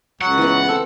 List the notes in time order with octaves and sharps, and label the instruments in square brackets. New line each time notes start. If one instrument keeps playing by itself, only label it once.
[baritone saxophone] C#2 [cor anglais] F#3 [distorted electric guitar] F#5
[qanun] E3 B3
[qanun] C4 [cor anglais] A4